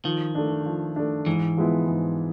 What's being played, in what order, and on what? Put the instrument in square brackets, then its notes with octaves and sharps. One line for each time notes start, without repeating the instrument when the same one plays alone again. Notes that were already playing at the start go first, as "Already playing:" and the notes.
[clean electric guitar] D#3 [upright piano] F3
[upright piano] A3 D4
F3
A3 D4
[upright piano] G#2 [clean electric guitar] E3
[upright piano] F3 G#3 B3 E4
G#2